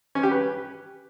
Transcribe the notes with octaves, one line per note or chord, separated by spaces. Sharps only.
C#4
G4
B4